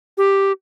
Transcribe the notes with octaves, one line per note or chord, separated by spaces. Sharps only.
G4